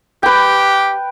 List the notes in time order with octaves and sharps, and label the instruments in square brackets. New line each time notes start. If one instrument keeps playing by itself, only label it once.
[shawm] G4 [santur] B4 G5